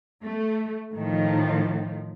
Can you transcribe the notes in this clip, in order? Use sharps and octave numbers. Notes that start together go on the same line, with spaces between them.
A3
A2 D#3 F3